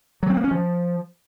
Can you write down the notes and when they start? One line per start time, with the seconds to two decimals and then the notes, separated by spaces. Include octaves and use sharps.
0.23 F#3
0.30 C4
0.37 A#3
0.44 C#4
0.51 F3